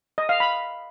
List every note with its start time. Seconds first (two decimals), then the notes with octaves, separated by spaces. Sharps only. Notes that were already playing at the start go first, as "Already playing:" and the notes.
0.18 D#5
0.29 F5
0.40 B5